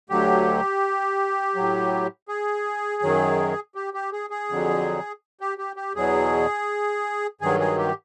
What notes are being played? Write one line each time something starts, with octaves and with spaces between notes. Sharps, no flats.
D2 D3 F#3 G4
A2 F#3
G#4
F#2 D#3 F#3
G4
G4
G#4
G#4
F2 D3 F#3
G4
G4
G4
E2 B2 F#3 G#4
G2 D#3 F#3 G#4
G#4
G4